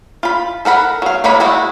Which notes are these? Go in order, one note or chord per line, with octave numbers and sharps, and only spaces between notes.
F4 B5
A4 A#4 F#5 B5
F#3 F5
E3 G#3 A#3 C#5 B5
G#3 A3 E4 F#4